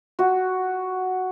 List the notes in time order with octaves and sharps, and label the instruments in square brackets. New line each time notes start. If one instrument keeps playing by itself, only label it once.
[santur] F#4